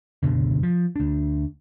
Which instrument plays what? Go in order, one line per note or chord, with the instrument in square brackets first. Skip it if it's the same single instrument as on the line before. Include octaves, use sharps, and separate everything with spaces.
[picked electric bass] F#1 D2 B2 D3
F3
D2 D4